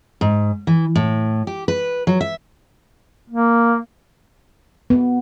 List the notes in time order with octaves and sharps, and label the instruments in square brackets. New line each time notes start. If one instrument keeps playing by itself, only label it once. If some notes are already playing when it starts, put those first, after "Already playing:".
[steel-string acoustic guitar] G#2
E3
A2
G4
B4
F#3
E5
[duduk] A#3
[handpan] B3